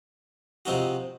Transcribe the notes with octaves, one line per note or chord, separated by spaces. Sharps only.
C3 F3 C4 D#4 F#4